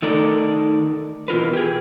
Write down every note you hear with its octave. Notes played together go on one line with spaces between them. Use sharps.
D#3 A3 D#4 A4 A#4 D5
B2 E3 F4 A#4 B4
G4 G#4